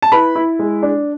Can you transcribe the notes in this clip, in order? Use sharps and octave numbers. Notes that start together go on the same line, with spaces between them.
A5
E4 B4 B5
E4
G#3
D4